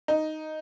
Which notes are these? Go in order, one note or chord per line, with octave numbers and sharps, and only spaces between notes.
D#4